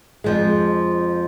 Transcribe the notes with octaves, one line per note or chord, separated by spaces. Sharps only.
F2 F3 G#3